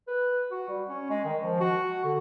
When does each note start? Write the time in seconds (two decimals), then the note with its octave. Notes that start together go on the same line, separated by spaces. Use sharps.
0.08 B4
0.51 F#4
0.69 G3
0.89 C#4
1.10 G#3
1.25 D#3
1.42 F3
1.60 F#4
2.04 D3